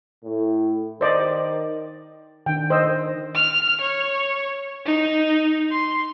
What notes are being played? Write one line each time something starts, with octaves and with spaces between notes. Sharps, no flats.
A2
D#3 C5 D5 D#5
D#3 D4 G5
C5 D#5 E6
F6
C#5
D#4
C6